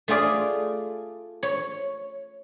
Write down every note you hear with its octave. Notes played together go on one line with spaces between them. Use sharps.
A3 F4 G#4 D5
C#5